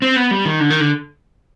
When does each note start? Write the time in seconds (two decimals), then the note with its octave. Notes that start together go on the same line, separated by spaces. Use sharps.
0.02 C4
0.16 B3
0.31 G3
0.45 D#3
0.60 D3
0.70 D#3
0.80 D3